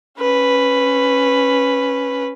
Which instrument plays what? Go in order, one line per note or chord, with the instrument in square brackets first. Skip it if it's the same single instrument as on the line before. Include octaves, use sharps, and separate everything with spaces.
[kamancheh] C#4 B4